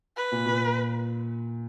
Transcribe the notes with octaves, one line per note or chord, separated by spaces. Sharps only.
B4
A#2
A#2